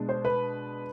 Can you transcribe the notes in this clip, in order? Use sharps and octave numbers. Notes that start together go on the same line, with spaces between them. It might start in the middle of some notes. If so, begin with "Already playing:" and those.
Already playing: B2 G#3 D4
C5
B4